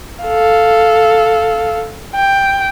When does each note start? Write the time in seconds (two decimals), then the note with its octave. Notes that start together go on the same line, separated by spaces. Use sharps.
0.24 A4 F5
2.15 G5